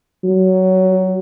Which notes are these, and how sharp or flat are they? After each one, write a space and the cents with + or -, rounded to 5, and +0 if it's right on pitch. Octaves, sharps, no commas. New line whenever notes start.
F#3 +15